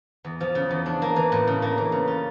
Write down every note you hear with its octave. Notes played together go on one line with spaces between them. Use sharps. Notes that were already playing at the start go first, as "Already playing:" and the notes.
E2
F3
C#3
E2
D4
A#3
E3
A2
C#3
A#3
E3
C#3
F4